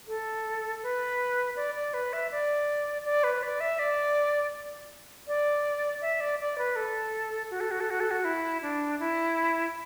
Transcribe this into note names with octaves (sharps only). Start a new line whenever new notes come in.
A4
B4
D5
D5
B4
E5
D5
D5
B4
D5
E5
D5
D5
E5
D5
D5
B4
A4
F#4
A4
F#4
A4
F#4
A4
F#4
E4
D4
E4